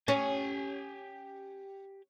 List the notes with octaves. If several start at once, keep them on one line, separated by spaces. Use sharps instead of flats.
C#4 G4 G#5